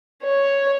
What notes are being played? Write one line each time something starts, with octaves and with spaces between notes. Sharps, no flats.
C#5